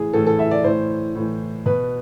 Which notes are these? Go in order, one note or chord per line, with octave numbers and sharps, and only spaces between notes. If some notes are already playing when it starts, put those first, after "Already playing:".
Already playing: A2 E3 G#4
A2 E3 A4
A4
E5
D5
A2 E3 C5
A2 E3
B2 B4